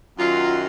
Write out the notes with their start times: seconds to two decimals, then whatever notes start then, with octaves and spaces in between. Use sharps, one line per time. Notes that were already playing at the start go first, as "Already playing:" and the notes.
0.18 F#2 D#3 F#3 F4